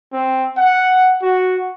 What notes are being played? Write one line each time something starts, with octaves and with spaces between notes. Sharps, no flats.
C4
F#5
F#4